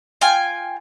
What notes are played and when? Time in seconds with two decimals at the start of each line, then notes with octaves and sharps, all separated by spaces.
0.21 F4 G5 G#5